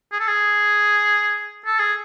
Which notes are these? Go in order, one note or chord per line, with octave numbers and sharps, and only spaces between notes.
G#4
A4
G#4
A4
G#4